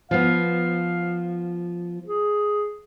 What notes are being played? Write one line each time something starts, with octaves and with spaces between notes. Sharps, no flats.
F3 B3 F5
G#4